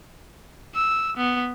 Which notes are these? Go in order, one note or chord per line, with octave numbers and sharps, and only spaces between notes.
E6
B3